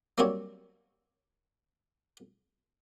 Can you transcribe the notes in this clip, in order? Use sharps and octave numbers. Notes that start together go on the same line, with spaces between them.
F#3 G3 A#3 C4 D4 C#5